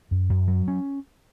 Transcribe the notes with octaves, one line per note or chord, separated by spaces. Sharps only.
F#2
F#2
F#3
C#4